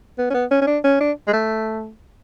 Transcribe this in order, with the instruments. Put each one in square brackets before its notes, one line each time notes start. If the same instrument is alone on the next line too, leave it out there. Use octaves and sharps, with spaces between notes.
[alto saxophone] B3
C#4
B3
C#4
C#4
D4
C#4
D4
G#3
A3